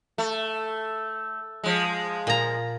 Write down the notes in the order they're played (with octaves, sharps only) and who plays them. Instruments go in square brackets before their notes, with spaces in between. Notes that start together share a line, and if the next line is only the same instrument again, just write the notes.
[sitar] A3
F3 G#3
[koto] A#2 A#5